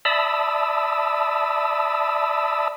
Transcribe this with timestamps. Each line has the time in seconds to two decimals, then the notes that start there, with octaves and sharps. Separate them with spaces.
0.05 D5 E5 A5 B5 D#6 E6